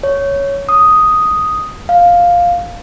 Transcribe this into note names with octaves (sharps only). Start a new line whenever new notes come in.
C#5
D#6
F5